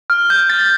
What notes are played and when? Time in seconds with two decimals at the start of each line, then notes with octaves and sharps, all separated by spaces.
0.10 F6
0.30 G6
0.50 A6